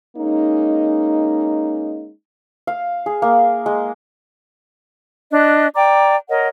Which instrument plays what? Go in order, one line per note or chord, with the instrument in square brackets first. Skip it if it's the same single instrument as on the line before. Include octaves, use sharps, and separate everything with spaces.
[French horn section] G#3 A#3 C#4 D#4
[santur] F5
G#4
A#3
G#3
[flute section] D4 D#5 F#6
D5 G5 A#5 D6
A#4 C#5 D#5 F#5